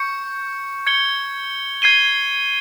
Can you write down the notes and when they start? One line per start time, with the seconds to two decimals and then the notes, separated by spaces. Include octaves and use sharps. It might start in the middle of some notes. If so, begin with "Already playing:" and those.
Already playing: C#6 G6 C#7
0.87 G#6 C#7 G7
1.82 G#6 C7 D#7 G7